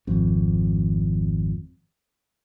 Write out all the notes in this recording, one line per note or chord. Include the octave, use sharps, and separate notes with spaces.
G#1 F2